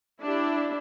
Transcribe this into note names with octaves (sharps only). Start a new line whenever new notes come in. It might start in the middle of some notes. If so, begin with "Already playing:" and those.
D4 E4 G4